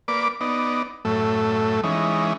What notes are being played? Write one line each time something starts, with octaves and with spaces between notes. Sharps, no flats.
A#3 B4 D5 D6
B3 D#4 D5
F#2 A2 A3
E3 G#3 C#4 D#4